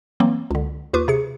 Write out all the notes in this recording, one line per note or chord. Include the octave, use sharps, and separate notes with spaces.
E3 F#3 A#3 C4
C#2 D3
D#2 F4 B4 C#6 D6
C3 G#4 C#7